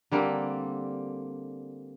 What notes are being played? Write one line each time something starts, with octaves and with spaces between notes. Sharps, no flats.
D3 G3 A#3 C4